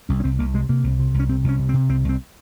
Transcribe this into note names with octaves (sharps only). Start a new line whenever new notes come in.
C2 C#4
C#4
C2 C4
C2 A#3
C3 G#3
C3 A#3
C2
C3
C2
C#4
C3 C4
C2 C#4
C3
C4
C3
C2 C4
C2 C4